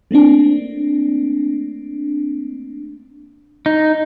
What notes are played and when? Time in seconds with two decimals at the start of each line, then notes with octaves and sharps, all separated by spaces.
0.11 A3 A#3 C4 D4
3.66 D#4